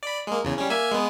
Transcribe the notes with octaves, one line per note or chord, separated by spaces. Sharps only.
D5 B5
G#3 A#3
E2 C#3
G3 C#4
A#3 E5 G#5
G#3 B3